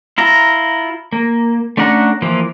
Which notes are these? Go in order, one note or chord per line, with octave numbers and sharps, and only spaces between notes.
E4 F4 A#5
A#3
A3 C#4 D4 F#5 A#5
E3 F3 A#3